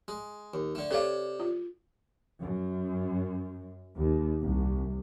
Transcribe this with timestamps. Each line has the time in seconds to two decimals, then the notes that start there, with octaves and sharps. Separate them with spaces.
0.08 G#3
0.54 D#2
0.75 D3 A3
0.91 C3 A4 C#5 D5 F5
1.40 F4
2.41 F#2
3.97 D#2
4.42 C2